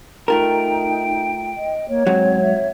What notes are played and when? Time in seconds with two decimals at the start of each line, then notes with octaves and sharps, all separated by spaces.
0.28 A3 D#4 F4 A#4 G5
1.57 D#5
1.89 A#3 C#5
2.07 G#2 F#3 C4
2.42 E5